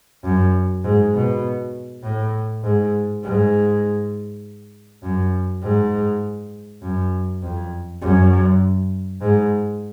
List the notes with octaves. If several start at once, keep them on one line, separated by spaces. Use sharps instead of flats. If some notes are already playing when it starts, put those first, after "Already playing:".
F#2
G#2
B2
A2
G#2
G#2
F#2
G#2
F#2
F2
F#2
G#2